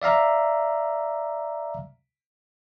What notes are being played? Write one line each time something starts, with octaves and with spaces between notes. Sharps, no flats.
D5 E5 F5 A#5